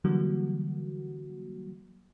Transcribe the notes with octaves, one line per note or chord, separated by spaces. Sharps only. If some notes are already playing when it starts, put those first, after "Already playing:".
D3 E3 F#3 G3 A#3 F#4